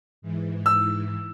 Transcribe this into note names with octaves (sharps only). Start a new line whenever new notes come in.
G#2 E3
E6